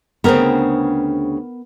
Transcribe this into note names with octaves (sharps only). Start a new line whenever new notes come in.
D2 C#3 B3 C4 A#4